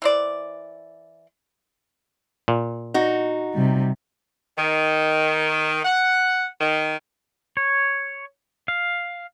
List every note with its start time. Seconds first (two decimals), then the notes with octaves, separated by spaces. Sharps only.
0.02 E3 C5 D5
2.48 A#2
2.94 D#4 F#4
3.54 C3 G3
4.58 D#3
5.85 F#5
6.61 D#3
7.57 C#5
8.68 F5